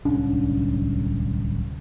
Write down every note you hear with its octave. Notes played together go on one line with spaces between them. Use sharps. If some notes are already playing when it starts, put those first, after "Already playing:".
D1 C2 C#4 D4